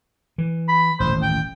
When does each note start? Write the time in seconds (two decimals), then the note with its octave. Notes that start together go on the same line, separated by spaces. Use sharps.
0.38 E3
0.68 B5
1.00 D#1 A1 C5
1.22 G5